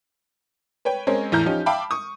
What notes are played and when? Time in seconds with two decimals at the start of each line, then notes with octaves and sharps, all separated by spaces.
0.85 B4 C#5 G5
1.07 G#3 C4 C#4 A#4 C#5
1.32 E2 A2 E4 A#5 F6 G6
1.45 F3 C#4 D#4 G4
1.66 E5 F5 G5 A5 B5 D6
1.91 C#6 D#6